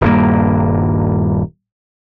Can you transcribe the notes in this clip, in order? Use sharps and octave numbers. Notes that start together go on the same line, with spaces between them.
D#1 G2 A#3